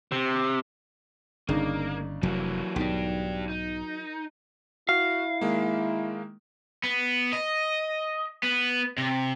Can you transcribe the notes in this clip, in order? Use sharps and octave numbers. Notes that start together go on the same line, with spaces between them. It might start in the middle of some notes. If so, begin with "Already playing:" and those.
C3
G1 C#3 A#3 D4 D#4
F1 E3 F#3 A#3
B1 G#2 D#3 D4 G4
D#4
E4 F#4 F5
D#3 G#3 A#3
B3
D#5
B3
C3